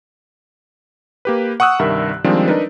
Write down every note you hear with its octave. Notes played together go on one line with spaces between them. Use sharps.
A#3 G4 B4
F#5 C#6 D#6 E6 F#6
C2 G2 D#3 A#4 E5
D#3 F3 G3 G#3 C4 D4
D4 D#4 A#4 B4